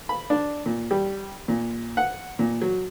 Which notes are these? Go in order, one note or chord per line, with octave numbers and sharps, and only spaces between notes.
B5
D4
A#2
G3
A#2
F#5
A#2
F#3